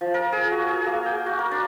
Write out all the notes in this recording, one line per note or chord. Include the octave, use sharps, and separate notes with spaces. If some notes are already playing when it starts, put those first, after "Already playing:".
F3
A#4
G#4
F#4
G#4
A#3
G5
F#4
A#4
D4